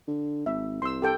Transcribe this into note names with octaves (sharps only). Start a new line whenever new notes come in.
D3
G#1 E5
C2 C6 E6
G4 A4 G5